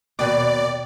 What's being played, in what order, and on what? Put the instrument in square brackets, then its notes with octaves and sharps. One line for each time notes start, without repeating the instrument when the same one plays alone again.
[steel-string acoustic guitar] D#2 B2 [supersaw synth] D5